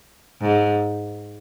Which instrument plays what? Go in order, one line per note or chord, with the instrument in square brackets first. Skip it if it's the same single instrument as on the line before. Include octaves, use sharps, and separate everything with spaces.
[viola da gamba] G#2